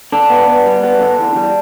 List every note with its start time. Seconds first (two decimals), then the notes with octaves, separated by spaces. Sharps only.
0.12 D3 D4
0.30 B3
0.48 B3
0.66 G3
0.83 B3
1.01 D3
1.19 E2
1.36 G3